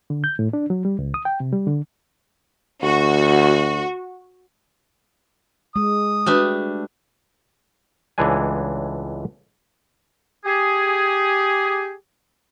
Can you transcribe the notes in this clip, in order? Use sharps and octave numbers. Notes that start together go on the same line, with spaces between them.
D3
G6
A2
D4
F#3
G3
C#2
D#6
G5
C3
G3
D3
D2 F#4
G#3 D#6
G3 A3 D4 F#4 B4
C#2 A2 E3 G#3 D4 G#5
G4 G#4